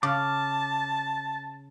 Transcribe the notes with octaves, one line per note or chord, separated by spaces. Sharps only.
C#3 A5 D6 F6